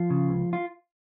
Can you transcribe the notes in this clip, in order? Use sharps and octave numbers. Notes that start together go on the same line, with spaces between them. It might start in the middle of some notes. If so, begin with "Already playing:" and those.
Already playing: F3 F4
C#3
C#2
F4